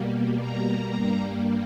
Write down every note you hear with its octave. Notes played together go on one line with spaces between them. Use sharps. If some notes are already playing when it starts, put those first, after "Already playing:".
Already playing: B2 G3 A#3
A#5
G2 G3 A#3